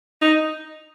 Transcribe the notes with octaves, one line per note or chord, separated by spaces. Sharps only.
D#4